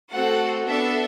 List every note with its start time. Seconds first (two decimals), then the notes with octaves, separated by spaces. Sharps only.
0.11 A3 C4 F#4 A4 F#5
0.65 B3 D4 A4 E5